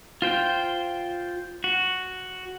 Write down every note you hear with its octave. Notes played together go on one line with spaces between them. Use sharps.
F4 C5 G5
F#4